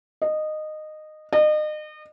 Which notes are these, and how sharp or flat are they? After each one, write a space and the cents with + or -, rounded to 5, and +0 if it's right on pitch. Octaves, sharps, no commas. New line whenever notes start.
D#5 -15
D#5 -35